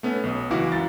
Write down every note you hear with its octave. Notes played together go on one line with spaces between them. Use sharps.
A3 B3 C#4
B1 D#6
C#2 E3 E4 F#4 F5 D6
F#2 A6